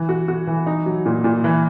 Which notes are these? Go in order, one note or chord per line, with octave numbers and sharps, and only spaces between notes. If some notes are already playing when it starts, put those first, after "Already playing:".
Already playing: E3
F#4
F#4
E3
D#4
F#3
A#2
A#2
E3